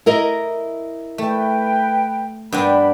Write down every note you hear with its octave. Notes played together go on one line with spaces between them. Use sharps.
E4 A#4 D#5
A3 B4 G5
G2 B3 D4 G5 B5